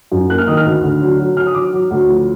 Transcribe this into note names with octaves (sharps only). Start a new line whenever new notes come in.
F#2
A#3 F#6
F6
D#3 D#6
F6
D2
D3
F#3
F#3
F#3 F6
D#6
F#3 D6
F#3
D2
F3